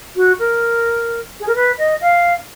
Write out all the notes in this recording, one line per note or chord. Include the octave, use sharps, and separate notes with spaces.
F#4
A#4
G#4
A#4
B4
D#5
F5